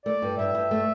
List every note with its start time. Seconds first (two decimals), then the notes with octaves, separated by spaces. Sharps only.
0.06 A3 D5
0.22 G2
0.38 G2 E5
0.55 G2
0.71 A3